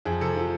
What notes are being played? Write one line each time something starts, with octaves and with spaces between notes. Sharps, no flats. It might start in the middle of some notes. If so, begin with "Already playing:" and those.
F2 G#4
C3 A4
F3